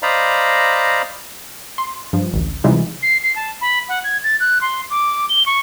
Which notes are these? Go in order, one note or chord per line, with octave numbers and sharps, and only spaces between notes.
C5 D5 D#5 F5 A#5 B5
C6
G2 F3
A1 D2
C3 E3 G3 G#3 D#4 F4
C7
C7
A5
B5
F#5
G#6
A6
F#6
C6
D6
G7
C#6